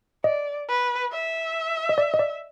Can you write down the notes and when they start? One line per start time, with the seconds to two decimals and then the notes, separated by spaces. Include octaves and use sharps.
0.24 D5 D#5
0.68 B4
1.12 E5
1.89 D#5
1.98 D5
2.14 D#5
2.19 D5